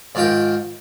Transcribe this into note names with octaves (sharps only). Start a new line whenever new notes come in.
G#2 D#3 F4 A#4 G5